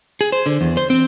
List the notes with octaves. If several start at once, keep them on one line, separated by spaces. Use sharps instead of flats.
G#4
C5
D3
E2
C5
C4